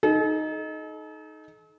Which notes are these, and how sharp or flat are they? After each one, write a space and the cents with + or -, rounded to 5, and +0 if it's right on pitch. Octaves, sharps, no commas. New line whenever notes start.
D#4 +5 A4 -45